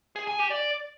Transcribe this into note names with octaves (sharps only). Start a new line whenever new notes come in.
G#4
G#5
G4
D5